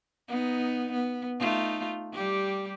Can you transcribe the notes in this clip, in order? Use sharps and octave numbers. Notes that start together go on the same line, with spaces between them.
B3 D#4
B3
A3 D#4 F4
G3 G4